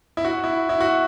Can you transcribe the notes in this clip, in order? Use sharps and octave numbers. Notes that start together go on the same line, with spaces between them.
E4
F#4
E4
E4
F#4